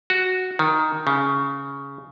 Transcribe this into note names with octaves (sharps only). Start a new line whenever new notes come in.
F#4
D#3
C#3